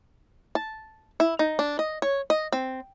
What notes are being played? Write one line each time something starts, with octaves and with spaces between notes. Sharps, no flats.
A5
E4
D#4
D4
D#5
C#5
D#5
C4